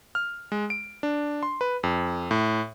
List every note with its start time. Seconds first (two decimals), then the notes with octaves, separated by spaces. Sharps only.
0.15 F6
0.52 G#3
0.70 D7
1.03 D4
1.43 C6
1.61 B4
1.83 F2
2.31 A2